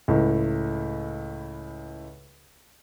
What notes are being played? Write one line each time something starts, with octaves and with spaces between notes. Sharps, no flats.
C#2 A2